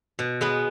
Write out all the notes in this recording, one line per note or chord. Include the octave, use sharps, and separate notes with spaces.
B2
G#3 B3